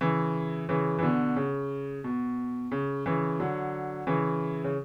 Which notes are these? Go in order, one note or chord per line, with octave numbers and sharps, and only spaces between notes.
C#3 E3
C#3 E3
E3
B2 D3
C#3
B2
C#3
C#3 E3
D3 F#3
C#3 E3
C#3